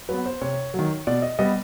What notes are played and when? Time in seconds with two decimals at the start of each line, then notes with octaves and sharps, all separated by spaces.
0.09 F#3 B4
0.14 B3
0.26 C5
0.41 C3 C#5
0.74 D#3 F#3
1.07 B2 D5
1.22 D#5
1.39 G3 B3 D#5